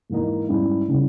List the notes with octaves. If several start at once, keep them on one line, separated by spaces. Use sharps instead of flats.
G#2 E3 A#3 D#4
G#2 G3 C#4 E4
C#3 G3 C#4 E4